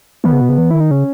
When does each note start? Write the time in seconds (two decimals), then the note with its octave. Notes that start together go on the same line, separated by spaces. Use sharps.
0.24 D#3 B3
0.33 C#3
0.41 B2
0.49 C#3
0.58 E3
0.71 D#3 E4
0.80 D#4
0.91 C#3 C#4